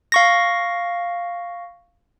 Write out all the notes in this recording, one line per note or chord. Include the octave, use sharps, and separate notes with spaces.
F5 C#6 A#6